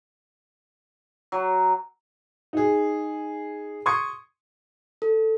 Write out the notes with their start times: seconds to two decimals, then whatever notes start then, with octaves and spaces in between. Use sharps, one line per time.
1.32 F#3
2.53 D#4 G#4
3.86 C6 C#6 D#6 G#6 C#7
5.02 A4